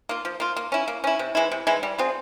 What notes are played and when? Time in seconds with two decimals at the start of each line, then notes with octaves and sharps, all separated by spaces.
0.09 A#3 F4
0.25 F3
0.40 A#3 F4
0.56 A#3
0.72 C#4 E4
0.88 A#3
1.04 C#4 E4
1.19 C3
1.35 E3 G#3 E4
1.52 C3
1.67 E3 G#3 E4
1.83 G3
1.98 C4 F4 G#4